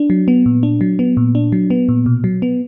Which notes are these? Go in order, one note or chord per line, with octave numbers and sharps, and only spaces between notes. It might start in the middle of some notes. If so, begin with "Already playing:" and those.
Already playing: D4
F#3
B3
A#2
D4
F#3
B3
A#2
D4
F#3
B3
A#2
B2
F#3
B3